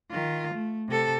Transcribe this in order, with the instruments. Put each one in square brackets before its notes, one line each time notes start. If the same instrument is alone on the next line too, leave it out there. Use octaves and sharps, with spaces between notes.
[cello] D#3 F4
A3
C3 A4